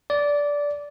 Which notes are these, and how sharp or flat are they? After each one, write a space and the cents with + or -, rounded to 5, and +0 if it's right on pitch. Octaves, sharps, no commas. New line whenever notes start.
D5 -15